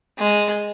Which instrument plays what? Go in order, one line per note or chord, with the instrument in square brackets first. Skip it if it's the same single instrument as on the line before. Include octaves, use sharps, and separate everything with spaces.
[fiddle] G#3